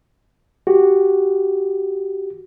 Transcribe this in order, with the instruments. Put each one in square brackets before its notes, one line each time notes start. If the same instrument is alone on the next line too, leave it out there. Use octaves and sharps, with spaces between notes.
[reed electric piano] F#4 G4